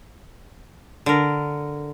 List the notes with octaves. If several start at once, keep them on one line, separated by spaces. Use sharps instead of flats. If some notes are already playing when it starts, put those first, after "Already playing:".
D3 A#4